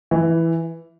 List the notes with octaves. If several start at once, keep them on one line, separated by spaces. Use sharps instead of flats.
E3